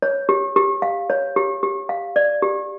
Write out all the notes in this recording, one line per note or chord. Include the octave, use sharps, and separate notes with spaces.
C#5
G4
G4
F5
C#5
G4
G4
F5
D5
G4